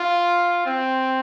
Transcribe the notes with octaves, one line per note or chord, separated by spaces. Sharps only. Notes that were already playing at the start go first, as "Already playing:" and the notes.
Already playing: F4
C4